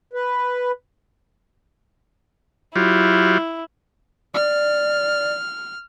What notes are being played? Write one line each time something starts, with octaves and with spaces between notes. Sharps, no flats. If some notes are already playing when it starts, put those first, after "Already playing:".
B4
F#3 E4 F4 G4
D5 F6